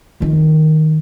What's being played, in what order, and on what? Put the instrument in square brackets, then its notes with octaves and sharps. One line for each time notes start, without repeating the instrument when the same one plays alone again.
[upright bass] F2 D#3